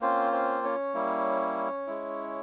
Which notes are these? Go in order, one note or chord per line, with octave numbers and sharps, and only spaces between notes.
A#3 C4 C#4 F4 C5
C4 C5
C#4 C#5
G3 A#3 E4
G#3 E4